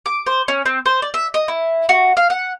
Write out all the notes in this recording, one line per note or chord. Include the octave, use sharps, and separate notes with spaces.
D6
C5
C#4
C4
C5
D5
E5
D#5
E4
F#4
F5
F#5